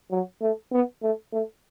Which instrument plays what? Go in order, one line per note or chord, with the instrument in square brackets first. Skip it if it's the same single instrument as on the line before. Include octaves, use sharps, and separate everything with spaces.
[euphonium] F#3
A3
B3
A3
A3